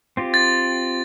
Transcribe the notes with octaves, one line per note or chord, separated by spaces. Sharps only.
C4 F4 G4
A6